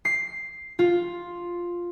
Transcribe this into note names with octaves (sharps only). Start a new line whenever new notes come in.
C7
F4